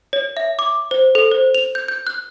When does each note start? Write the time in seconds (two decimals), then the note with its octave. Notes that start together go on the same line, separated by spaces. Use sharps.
0.13 C#5
0.37 E5
0.59 D6
0.91 C5
1.15 A4
1.32 C5
1.54 F7
1.75 G6
1.88 G6
2.07 F#6